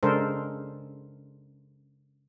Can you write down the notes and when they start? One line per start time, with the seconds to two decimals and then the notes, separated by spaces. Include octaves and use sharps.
0.03 C#3 G#3 D4 A4 A#4 C5